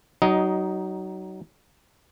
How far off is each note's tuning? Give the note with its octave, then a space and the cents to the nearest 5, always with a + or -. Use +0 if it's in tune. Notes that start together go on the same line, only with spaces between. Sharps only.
F#3 +25 D#4 +0 D#5 +15